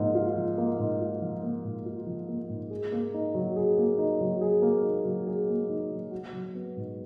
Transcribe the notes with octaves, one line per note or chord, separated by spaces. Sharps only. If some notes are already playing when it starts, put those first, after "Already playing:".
Already playing: G#2 F3 A#3
F4
F3
A#3
G#2
F4
F3
A#3
G#2
F4
F3
A#3
G#2
G#4
A#3
D#4
F#3
G#4
A#3
D#4
F#3
G#4
A#3
D#4
F#3
G#4
A#3
D#4
F#3
F#4
F#3
B3
G#2